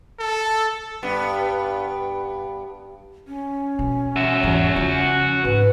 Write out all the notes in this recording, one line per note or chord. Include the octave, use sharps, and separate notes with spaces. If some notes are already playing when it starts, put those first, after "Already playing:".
A4
G2 B3
C#4
B2
F#4 E5
E2 G#2
C#3 F3
G#2 B4